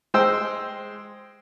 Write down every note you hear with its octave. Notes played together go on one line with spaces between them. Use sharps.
G#3 C5 G5 E6